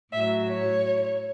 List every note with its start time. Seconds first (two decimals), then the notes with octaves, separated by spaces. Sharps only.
0.12 A2 F#3 E5
0.50 C#5